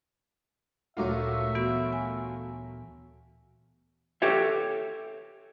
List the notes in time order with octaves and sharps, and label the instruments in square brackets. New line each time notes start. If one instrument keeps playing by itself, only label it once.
[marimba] D2 A#2 C#5 [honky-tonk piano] F#3 A3 F4 [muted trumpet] E5
[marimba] E3 B3 F#4
G#5
[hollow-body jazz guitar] G4 A4 C#5 E5